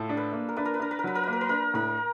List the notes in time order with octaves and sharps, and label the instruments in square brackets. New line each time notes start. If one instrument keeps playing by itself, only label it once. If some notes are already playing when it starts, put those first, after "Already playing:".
Already playing: [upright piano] A2 [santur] F4 A4
[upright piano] D4
[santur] B4
[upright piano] A#3
[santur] A#4
[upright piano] D4 [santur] B4
[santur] A#4
B4
[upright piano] D4 [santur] A#4
[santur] B4
A#4
[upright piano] F#3 [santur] B4
[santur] A#4
[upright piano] A#3 [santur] B4
[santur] A#4
B4
[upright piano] D4 [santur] A#4
[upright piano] A2 [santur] A#4